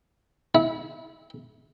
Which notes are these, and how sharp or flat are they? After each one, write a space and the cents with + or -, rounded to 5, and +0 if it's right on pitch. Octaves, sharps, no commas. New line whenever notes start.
E4 -25